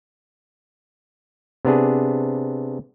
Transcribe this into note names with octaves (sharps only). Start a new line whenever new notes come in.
C3 B3 D4 G#4